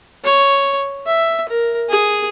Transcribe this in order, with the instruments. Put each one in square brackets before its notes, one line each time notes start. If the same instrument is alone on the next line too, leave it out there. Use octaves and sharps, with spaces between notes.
[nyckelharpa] C#5
E5
A#4
G#4